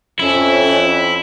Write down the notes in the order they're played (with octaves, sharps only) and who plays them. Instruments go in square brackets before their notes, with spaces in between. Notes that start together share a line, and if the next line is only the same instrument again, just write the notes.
[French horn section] F2 [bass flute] C#4 [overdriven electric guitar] E4